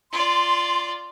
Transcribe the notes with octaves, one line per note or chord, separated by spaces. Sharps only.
F4 D5 C6